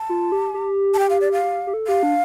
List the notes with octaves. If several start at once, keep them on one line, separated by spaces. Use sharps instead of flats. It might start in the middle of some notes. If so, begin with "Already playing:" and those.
Already playing: A5
F4
G4
G4
A5
G5
F5
D5
F5
G4
G4
A4
G4 F5
D4